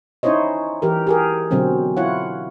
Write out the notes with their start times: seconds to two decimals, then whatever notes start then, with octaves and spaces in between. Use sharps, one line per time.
0.23 C#4 D#4 E4 C5 C#5 D#5
0.82 E3 G4 A#4
1.07 G4 G#4 A#4
1.51 B2 D3 F#3 C4 C#4
1.97 E4 F4 C#5 F#5